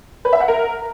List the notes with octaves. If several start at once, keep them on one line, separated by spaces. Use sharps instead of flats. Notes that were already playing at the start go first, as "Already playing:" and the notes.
B4
E5
F#5
A#4